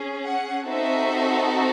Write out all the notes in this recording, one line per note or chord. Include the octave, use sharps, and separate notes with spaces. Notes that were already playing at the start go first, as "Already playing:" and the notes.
Already playing: C#4 G#4
F#5
C4 D#4 F#4 A4 E5